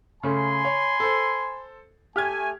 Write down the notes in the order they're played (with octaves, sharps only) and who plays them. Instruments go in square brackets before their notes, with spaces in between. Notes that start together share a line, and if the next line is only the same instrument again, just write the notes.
[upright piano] C#3 A3 C#4 [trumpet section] G#5 B5 C6
[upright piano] C#5
A4 C5
[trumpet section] A3 G#5 [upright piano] G4 F6 G#6